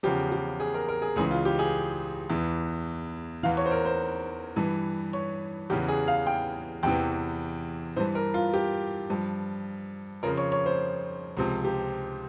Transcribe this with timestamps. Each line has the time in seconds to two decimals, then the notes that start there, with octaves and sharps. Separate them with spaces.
0.03 E2 C#3 F3 G4
0.32 G4
0.60 G#4
0.74 A#4
0.88 A#4
1.02 G#4
1.16 C#2 C#3 E3 G#4
1.31 F4
1.45 G4
1.59 G#4
2.30 E2 E3
3.43 E2 E3 F5
3.57 C#5
3.66 C5
3.71 A#4
3.85 C5
4.56 G2 E3
5.13 C#5
5.70 E2 C#3 E3 G4
5.88 G#4
6.08 F5
6.27 G5
6.83 E2 C3 E3 G5
7.96 G2 E3 C5
8.15 A#4
8.34 F4
8.54 G4
9.10 G2 F3
10.23 F2 C#3 F3 A#4
10.37 C#5
10.52 C#5
10.66 C5
11.37 C#2 C3 F3
11.65 G4